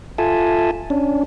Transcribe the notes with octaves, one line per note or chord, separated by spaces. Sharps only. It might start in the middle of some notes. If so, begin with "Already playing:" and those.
F4 A4 E5 G#5 A5
C#4 D4